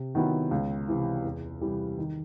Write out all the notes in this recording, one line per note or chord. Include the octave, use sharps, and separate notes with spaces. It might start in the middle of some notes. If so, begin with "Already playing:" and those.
Already playing: C3
D#3 F#3 B3 E4
C#2
C3 E3
E2
C3 E3 G3
D#3